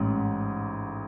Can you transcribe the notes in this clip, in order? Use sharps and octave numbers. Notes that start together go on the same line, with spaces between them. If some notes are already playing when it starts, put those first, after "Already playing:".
Already playing: A1 G#2